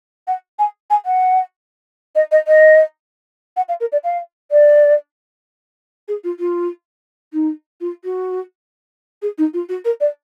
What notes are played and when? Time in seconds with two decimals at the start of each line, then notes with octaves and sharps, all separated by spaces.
0.27 F#5
0.59 G#5
0.90 G#5
1.05 F#5
2.15 D#5
2.31 D#5
2.47 D#5
3.56 F#5
3.68 F5
3.80 A#4
3.92 D5
4.04 F5
4.51 D5
6.08 G#4
6.24 F4
6.39 F4
7.33 D#4
7.81 F4
8.04 F#4
9.22 G#4
9.38 D#4
9.54 F4
9.69 F#4
9.85 A#4
10.00 D5